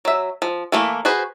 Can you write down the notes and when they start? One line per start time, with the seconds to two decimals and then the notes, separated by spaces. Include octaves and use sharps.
0.05 F#3 E5
0.42 F3
0.72 E3 A3 A#3
1.05 F#4 G#4 B4 C5